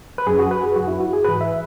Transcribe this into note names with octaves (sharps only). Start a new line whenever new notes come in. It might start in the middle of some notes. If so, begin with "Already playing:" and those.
B4
F#2 F#3 G#4
F#4
B4
G#4
F#2 F#3 F#4
E4
F#4
G#4
G#2 E3 B4
E5